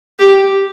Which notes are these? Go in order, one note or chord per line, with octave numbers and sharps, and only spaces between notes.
G4